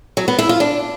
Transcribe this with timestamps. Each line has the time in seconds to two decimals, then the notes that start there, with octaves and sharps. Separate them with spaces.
0.17 F#3
0.28 B3
0.39 E4
0.49 F4
0.60 D4